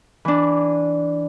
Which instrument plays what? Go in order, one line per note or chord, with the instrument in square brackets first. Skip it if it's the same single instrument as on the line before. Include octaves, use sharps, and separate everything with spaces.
[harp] E3 D4